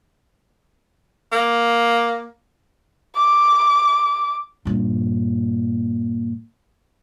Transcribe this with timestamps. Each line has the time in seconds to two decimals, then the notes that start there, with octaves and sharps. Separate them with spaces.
1.32 A#3
3.16 D6
4.65 G2 A#2